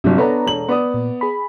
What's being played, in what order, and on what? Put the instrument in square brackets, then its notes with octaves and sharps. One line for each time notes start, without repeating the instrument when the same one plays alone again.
[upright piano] G1 C3 [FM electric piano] G2 F#3
[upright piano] B3 D4 [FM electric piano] A4 C#5 A#5
[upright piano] E1 F#7
B3 D5 D#6
[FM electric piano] A#2
G#4 B5